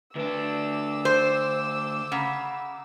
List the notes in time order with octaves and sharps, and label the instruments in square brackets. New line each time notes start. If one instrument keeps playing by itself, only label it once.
[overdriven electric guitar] D2 D4 [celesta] B4 [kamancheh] D6 E6
[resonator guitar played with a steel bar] C5 [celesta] G6
[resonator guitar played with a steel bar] C#3 [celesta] F#5 A#5 B5